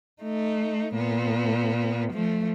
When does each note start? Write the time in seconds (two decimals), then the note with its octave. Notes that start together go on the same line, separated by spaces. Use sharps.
0.22 A3 D#4
0.95 A#2 B3
2.13 F3 A3